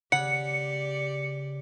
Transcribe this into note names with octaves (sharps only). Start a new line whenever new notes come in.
C#3 G4 D5 F#5 C#7